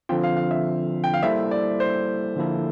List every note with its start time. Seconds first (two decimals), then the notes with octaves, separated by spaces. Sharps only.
0.09 D3 F3 C4 F4 G5
0.23 F5
0.37 F5
0.51 E5
1.04 G5
1.14 F5
1.23 G3 A#3 E4 A4 C5 E5
1.51 D5
1.80 C5
2.36 D3 F3 A#3 E4 A4